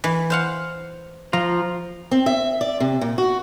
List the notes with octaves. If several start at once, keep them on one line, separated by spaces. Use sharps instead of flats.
E3
C5 F5 F#5
F3 F4 A#5
C4
E5
D5
C3
A#2
F#4